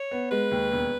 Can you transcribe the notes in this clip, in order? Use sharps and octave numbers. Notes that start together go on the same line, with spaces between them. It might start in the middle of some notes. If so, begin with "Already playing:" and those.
Already playing: C#5
B3
G#3 B4
D#2
E1